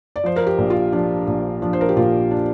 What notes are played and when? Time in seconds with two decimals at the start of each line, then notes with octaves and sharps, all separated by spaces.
0.16 D5
0.24 F3 C5
0.36 A#4
0.47 G4
0.58 A#1
0.70 F4
0.92 F3 D4
1.27 A#1
1.62 F3 D4
1.73 C5
1.81 A#4
1.89 G4
1.97 A#2 F4
2.31 D4